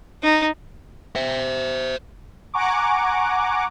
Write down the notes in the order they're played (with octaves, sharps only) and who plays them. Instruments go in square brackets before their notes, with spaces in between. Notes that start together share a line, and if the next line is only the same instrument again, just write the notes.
[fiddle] D#4
[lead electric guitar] C5 E5
[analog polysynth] F#5 G#5 A#5 C#6 D6